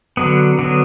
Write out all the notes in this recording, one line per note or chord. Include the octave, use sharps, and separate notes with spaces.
D3 F#3 B3
D3 F#3 B3